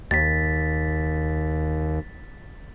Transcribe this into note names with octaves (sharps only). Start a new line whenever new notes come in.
D#2 A6 B6